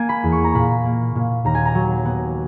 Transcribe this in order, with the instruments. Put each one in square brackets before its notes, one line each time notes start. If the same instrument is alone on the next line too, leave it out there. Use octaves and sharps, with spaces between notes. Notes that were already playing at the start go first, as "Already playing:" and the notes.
Already playing: [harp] A#3 G#5
B5
E2
C#6
A#5
A#2 B5
A#3
A#2
D#2 A#5
G#5
A#5
F#3
B3